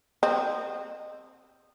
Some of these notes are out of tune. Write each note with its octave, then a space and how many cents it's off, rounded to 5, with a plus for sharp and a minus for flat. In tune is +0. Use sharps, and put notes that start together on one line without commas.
C4 +0 D#5 -25